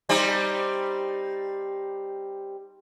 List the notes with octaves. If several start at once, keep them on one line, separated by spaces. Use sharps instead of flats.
G3 C4 D#4